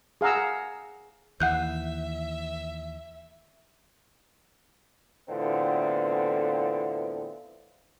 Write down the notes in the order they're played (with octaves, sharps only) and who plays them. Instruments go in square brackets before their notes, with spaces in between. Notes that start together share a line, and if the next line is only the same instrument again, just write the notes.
[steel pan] G#4 F5 F#5 A#5 E6
[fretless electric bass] D#2 E3 [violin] E5 [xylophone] F#5 F#6 G6
[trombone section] E2 A2 D3 B3 C4 F4